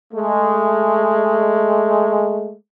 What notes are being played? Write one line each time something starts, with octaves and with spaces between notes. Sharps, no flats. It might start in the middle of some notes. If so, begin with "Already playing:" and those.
G#3 A3